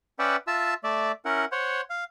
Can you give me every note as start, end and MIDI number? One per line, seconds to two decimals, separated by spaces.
0.19 0.36 61
0.19 0.36 71
0.19 0.36 74
0.19 0.36 76
0.19 0.36 78
0.19 0.36 79
0.47 0.74 65
0.47 0.74 76
0.47 0.74 81
0.47 0.74 88
0.84 1.12 57
0.84 1.12 74
0.84 1.12 76
1.25 1.45 61
1.25 1.45 64
1.25 1.45 70
1.25 1.45 78
1.52 1.81 72
1.52 1.81 73
1.52 1.81 78
1.90 2.04 77